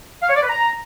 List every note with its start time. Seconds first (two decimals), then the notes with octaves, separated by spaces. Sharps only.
0.22 F5
0.29 C#5
0.36 D5
0.43 B4
0.49 A#5